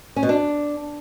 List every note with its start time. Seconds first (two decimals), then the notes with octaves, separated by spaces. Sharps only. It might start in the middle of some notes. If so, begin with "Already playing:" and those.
0.16 C#4
0.23 B2
0.29 D4